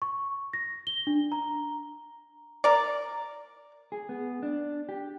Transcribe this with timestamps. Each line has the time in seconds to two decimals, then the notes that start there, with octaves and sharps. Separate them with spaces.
0.02 C#6
0.53 A#6
0.87 G7
1.07 D4
1.32 A#5
2.64 A#4 D5
3.92 G#4
4.09 B3
4.43 D4
4.89 G4